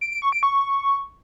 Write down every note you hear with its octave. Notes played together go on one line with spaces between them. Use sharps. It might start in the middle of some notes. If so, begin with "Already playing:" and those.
D7
D7
C#6
D7
C#6